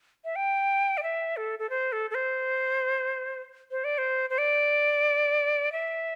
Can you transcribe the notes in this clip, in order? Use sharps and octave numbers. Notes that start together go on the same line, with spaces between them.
E5
G5
D5
E5
A4
A4
C5
A4
A4
C5
C5
D5
C5
C5
D5
E5